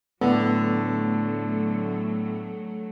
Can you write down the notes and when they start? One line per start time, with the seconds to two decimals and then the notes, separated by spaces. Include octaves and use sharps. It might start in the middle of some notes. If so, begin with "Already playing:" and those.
0.21 A2 D3 F#3 A3 B3